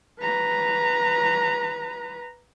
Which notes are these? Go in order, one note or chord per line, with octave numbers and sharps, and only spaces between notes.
B4 A#5